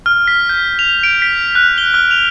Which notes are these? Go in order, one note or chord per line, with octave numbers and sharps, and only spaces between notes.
F6
B6
G6
F7
D7
B6
F#6
G7
F6
F7